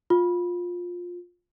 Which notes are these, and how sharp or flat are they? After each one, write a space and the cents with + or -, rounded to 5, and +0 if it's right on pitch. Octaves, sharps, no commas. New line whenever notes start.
F4 +15